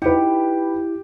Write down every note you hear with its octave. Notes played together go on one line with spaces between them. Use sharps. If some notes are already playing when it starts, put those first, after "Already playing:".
D#4 E4 G4 B4